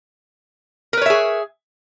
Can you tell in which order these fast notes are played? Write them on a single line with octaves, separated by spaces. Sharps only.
A#4 B4 C#5 E5 G#4